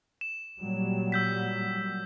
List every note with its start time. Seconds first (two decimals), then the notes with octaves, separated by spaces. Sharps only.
0.21 E7
0.60 A#2 F#3 G3
1.12 E6 G6 B6